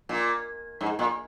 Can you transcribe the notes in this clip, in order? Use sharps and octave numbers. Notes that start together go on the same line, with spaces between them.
A#2
G#2
A#2